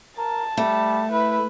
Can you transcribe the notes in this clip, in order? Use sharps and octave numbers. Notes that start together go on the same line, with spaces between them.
A#4 A5
G3 A3
E4 B4